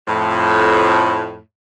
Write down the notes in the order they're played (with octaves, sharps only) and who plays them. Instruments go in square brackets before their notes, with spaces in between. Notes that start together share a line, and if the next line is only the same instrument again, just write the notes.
[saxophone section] F2 A2